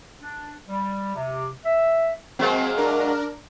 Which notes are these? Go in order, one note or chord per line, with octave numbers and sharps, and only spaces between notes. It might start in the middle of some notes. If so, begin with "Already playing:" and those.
D4
G3
C3
E5
F#3 G#3 A#3 C4
D4 A#4